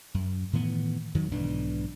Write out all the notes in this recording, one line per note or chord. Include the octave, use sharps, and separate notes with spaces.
F#2
A2 D#3 E3 B3
F2 D#3 F#3
B1 G#2 E3 D4